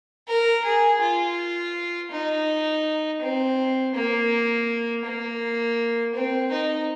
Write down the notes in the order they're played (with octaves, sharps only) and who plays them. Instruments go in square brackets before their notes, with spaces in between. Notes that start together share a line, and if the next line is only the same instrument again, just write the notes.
[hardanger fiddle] A#4
G#4
F4
D#4
C4
A#3
A#3
C4
D#4